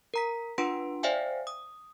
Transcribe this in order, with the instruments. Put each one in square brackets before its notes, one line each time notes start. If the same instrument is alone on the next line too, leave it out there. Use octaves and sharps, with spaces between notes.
[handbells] A#4 A#5 B6
D4 F4 B4 F#5 C6 D7
C5 D5 E5 F5 G5 G#5
D#6